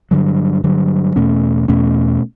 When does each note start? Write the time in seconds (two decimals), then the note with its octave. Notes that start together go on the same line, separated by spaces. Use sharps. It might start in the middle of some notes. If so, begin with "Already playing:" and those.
0.11 G2 D3 F#3
0.64 G2 D3 F#3
1.16 E2 B2 A3 C#4
1.68 E2 B2 A3 C#4